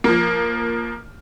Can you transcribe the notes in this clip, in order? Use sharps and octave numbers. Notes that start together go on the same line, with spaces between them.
F3 A#3